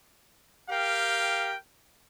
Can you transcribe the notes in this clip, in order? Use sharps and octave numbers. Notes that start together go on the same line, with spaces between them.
G4 A#4 F5 G5